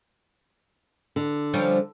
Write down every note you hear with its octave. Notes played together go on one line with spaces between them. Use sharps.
D3
F3 G3 C#4